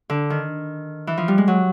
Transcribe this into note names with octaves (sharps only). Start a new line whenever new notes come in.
D3
D#3
E3
F3
G3
G#3
F#3